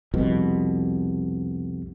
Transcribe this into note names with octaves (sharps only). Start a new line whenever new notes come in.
C2 F2 B2